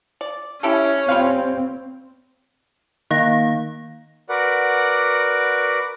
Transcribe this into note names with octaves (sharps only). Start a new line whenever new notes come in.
D5
C#4 E4 G4 A4
G3 C4 F4 F5
D#3 A#3 F5 A#6
F#4 A#4 B4 D5 F#5